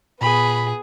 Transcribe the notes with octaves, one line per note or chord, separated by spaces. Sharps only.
A#2 B3 G#4 B5